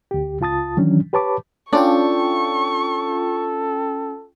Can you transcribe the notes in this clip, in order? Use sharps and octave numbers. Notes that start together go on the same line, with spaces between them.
D2 G4
C#2 F4 A5 D#6 A6
D#3 E3 F#3 C#4 D4
G4 B4 C#5 A5 B5 D6
C#4 D4 F4 A4 D5 G5 C#6